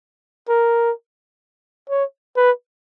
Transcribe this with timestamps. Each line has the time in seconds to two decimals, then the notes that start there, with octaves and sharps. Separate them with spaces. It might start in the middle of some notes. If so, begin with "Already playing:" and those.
0.49 A#4
1.90 C#5
2.37 B4